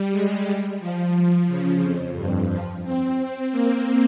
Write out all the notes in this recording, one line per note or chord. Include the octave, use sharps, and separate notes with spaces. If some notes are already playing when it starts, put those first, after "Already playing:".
Already playing: G3
G#3
G3
F3
F3
C#3
F2
G2
F3
C4
C4
A#3